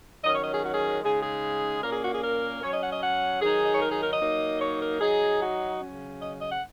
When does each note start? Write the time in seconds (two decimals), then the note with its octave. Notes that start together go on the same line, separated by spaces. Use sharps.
0.23 D#3 F#3 C#4 D#5
0.34 C#5
0.43 D#5
0.53 G#4
0.64 F#4
0.73 G#4
1.03 C#3 G#3 D#4 G#4
1.23 G#4
1.82 A#2 A#3 C#4 A#4
1.93 G#4
2.03 F#4
2.13 G#4
2.23 A#4
2.63 F#3 C#4 C#5
2.72 D#5
2.82 F#5
2.91 D#5
3.02 F#5
3.41 D#3 F#3 D#4 G#4
3.64 D#5
3.73 C#5
3.81 A#4
3.92 G#4
4.02 A#4
4.11 D#5
4.21 F#3 A#3 D#4
4.61 C#5
4.81 A#4
5.00 F#3 D#4 G#4
5.40 F#4
5.81 C#3 F#3 C#4
6.21 D#5
6.41 D#5
6.51 F#5